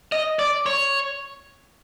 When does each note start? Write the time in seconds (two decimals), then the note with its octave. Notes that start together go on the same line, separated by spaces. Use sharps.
0.12 D#5
0.39 D5
0.66 C#5